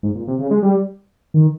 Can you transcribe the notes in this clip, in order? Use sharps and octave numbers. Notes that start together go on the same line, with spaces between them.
G#2
A#2
C3
C#3
G#3
G3
D#3